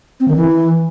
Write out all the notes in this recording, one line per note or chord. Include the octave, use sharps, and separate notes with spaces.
C4
D#3
E3